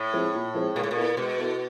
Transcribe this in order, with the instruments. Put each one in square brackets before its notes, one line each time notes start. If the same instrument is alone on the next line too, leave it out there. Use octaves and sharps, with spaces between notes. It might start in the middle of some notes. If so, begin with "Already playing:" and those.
Already playing: [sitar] A2
[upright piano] F3 G#3 C4 E4
A#2
F3 G#3 C4 E4
[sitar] A#2 [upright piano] G#3
[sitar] A2
A#2
[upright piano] B3 E4 A4
[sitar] B2 [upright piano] G#3
[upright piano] B3 E4 A4